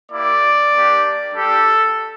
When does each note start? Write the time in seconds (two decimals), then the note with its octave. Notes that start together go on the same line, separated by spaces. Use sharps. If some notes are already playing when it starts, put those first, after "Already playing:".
0.12 A#3 E4 G4 D5
0.73 A#3 D4 G4
1.34 G3 D4 G4 A4